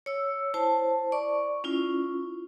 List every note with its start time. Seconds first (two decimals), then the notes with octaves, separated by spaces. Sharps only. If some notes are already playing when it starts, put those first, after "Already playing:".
0.06 C#5 E6
0.54 E4 C5 A5
1.12 D5 C#6 D6
1.64 C#4 E4 F4